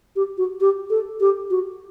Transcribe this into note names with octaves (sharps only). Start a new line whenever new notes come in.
G4
F#4
G4
A4
G4
F#4